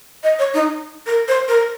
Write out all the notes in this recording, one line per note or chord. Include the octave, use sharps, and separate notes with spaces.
D#5
C#5
D#4
A#4
C5
A#4